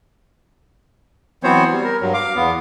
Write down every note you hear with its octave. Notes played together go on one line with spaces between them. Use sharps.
E3 F#3 B3 C4 C5 C#5
G3
A#4
G2 F#3
F5 D6
E2 B3